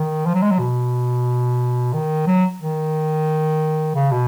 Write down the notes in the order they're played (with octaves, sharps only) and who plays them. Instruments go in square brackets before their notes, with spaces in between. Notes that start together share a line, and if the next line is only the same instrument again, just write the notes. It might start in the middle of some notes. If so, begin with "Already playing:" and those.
Already playing: [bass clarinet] D#3
F3
F#3
G#3
F#3
B2
D#3
F#3
D#3
C#3
B2